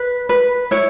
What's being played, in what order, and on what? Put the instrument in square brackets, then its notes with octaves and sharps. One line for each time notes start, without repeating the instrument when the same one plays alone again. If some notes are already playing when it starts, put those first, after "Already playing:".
Already playing: [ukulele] B4
B4
E4 C#5